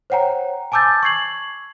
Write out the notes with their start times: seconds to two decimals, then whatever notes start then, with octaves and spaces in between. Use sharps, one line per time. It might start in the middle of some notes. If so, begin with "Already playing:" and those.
0.10 C5 C#5 F#5 G5 A#5
0.72 G#5 A5 D6 E6 G6 A6
1.03 C#6 G#6 C7 F#7